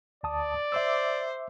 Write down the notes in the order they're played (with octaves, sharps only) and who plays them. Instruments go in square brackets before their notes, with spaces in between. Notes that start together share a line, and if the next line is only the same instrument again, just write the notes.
[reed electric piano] D2 A5 D#6 [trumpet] D5
[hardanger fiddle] C5 [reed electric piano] E5 D6 E6